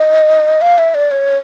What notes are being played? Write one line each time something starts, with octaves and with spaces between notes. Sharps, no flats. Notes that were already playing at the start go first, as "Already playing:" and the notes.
Already playing: D#5
F5
E5
D5
C#5